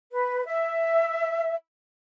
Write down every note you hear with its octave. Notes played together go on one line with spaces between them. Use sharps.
B4
E5